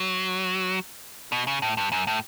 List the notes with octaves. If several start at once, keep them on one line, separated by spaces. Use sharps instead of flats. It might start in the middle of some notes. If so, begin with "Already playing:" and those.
Already playing: F#3
B2
C#3
A2
G2
F#2
A2